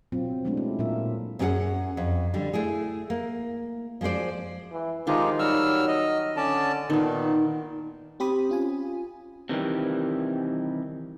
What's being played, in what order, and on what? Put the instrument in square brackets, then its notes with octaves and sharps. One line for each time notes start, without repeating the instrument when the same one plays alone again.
[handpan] B2 F#3 C4 F4
F#3 G#3 A3 C#4 D4
E4
A#2 F#3 F4 A#4 E5
[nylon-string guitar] F#2 C4 C#4 G4 G#4 F#5
F2
D3 G3
A3 E4 G#4
A#3
F3 G#3 F#4 C5 D5
[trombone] E3
[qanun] D#3 F4 G#4 [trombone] F3 [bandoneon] G#3 D#4 G4
[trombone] F#3 [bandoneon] G3 E6 F6 [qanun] F#4
[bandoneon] D#5
[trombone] D3 [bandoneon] C#4 D5 A5
[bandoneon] A#2 [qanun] D#3 D#4 [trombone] B3
[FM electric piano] C4 G4 C5 B5 D#6
C#4 F4 G#5
[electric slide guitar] C3 D#3 E3 G3